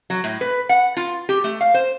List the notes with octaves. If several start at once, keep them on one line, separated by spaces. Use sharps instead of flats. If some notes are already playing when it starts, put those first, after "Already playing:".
F#3
A2
B4
F#5
F4
G4
A3
F5
C5